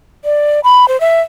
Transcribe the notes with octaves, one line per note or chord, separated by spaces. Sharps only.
D5
B5
C5
E5